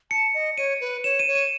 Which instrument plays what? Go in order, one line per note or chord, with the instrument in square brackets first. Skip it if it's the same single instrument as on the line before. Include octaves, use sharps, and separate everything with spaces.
[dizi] A5 [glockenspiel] C#7
[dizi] D#5
[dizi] C#5 [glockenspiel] D#7
[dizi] B4
[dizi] C#5 [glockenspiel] E7
[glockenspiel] D#7
[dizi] C#5
[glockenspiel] D#7